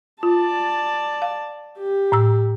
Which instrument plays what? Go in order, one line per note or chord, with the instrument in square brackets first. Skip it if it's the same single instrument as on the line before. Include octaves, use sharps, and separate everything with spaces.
[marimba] F4 [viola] D5 A5
[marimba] F5
[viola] G4
[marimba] A2 A#5 E6